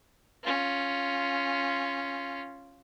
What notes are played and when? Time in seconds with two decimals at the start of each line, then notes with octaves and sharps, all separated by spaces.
0.43 C#4 F4